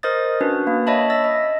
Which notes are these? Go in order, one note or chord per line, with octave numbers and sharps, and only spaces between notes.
A#4 C5 D#5 D#6 A6
C#4 D4 F#4 B4
A#3
C#5 D#5 E5 A5 B5
E5 E6 A6 A#6
D#5